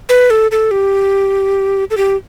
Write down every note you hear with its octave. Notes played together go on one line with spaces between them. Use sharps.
B4
A4
A4
G4
A4
G4